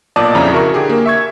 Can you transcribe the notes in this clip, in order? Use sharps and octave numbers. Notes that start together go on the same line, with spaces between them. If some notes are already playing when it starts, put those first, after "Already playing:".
B1 A#2 D5 D#5 A5 D#6
F2 C#3 E4 A#5
F#4 G#4 A#4 E5 C#6
D3 G4 G#4
A#3 A#4
E5 C#6 G#6